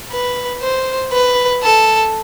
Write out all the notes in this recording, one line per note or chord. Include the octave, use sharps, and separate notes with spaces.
B4
C5
B4
A4